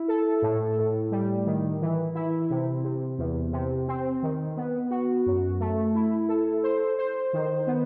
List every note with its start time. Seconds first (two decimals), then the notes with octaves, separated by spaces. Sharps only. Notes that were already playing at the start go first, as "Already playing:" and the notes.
Already playing: E4
0.08 A4
0.42 A2
0.78 A2
1.11 G3
1.46 D#3
1.81 E3
2.15 E4
2.50 C3
2.84 C3
3.18 E2
3.52 C3
3.88 C4
4.23 D#3
4.57 B3
4.90 F#4
5.26 F#2
5.60 A3
5.95 E4
6.28 A4
6.63 C5
6.98 C5
7.33 D#3
7.67 B3